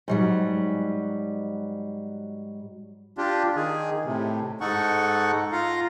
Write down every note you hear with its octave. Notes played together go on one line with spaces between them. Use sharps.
G#2 F#3 G3
D4 F4 G4
D#3 G#4
A2 C3
G#2 D#4 A4 F#5 C#6
F4 F5 A#5